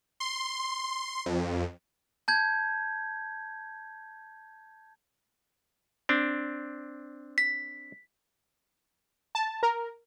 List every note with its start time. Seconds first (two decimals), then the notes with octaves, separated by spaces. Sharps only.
0.20 C6
1.26 F2
2.28 A5 G6 G#6
6.09 C4 D4
7.38 B6
9.35 A5
9.63 A#4